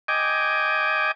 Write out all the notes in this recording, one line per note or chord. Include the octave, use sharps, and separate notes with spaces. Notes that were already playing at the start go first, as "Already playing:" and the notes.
D#5 G5 G#5 D6